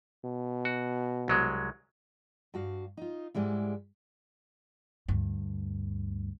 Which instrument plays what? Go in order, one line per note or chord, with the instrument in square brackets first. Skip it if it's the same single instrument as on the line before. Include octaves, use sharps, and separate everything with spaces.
[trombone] B2
[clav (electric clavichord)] F#4
C2 F#3 G#3
[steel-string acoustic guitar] G2 F#4 F5
D#4 F4
G#2 G3 G#3 E4
[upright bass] D2 G2